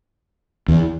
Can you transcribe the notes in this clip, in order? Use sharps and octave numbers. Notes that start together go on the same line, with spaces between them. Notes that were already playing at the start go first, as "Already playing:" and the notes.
E2